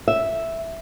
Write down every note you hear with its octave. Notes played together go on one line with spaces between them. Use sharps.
E5